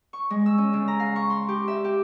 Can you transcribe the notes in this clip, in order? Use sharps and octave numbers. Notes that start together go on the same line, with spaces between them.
C#6
G#3
E6
C#4
C#3
A#5
F5
C#6
C6
G4
E5
G4